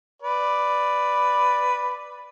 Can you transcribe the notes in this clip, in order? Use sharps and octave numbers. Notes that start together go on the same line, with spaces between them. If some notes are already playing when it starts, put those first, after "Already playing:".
B4 D5